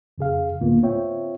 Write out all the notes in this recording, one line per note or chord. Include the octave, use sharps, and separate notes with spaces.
F2 C#3 G#4 F5
C#2 A2 D3 A#3 B3 F4
C4 F4 C#5 E5 G5